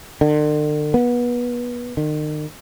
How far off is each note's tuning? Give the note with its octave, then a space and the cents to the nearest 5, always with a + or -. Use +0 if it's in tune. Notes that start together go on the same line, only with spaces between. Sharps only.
D3 +40
B3 -25
D#3 -40